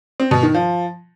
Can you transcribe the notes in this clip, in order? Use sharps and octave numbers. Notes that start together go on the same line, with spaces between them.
C4
B2
D#3
F3